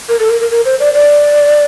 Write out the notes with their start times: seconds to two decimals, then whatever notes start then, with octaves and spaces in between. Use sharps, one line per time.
0.09 A#4
0.20 A4
0.30 A#4
0.41 A#4
0.51 A#4
0.65 C5
0.80 D5
0.94 D5